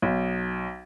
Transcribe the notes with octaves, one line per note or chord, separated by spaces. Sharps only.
B1